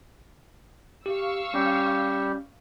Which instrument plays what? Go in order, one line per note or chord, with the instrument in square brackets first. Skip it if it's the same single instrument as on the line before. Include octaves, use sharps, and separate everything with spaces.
[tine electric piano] G4 [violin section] F5 C#6 E6
[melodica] G3 G4 [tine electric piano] C#4